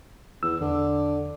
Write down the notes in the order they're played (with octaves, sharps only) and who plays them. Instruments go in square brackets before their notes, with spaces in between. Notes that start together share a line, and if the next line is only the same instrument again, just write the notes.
[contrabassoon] E2 [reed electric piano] E6
[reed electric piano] E2 [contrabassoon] D3